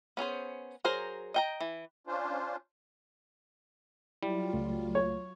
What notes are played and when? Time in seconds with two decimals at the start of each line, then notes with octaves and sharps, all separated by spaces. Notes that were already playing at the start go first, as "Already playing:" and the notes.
0.17 B3 C#4 G#4 C5
0.84 F#3 G#4 A#4 C5
1.34 D#5 G5 A#5
1.61 E3
2.07 C#4 D4 F4 C5
4.23 F#3 G3 E4 F4
4.53 C#2 A3
4.95 C#5